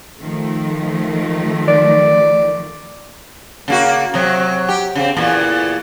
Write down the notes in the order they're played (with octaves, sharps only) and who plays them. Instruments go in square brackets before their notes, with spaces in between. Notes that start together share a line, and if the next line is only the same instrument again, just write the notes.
[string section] D#3 F3 A3
[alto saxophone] D5
[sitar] C#3 A#3 F#4
C3 F#3
G4
C#3 C4
E2 A#2 E3